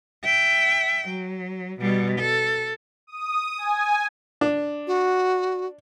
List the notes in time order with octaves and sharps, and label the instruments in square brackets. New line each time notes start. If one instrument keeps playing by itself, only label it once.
[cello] E5 G5
F#3
B2 G3
A4
[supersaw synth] D#6
G#5
[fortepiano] D4
[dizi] F#4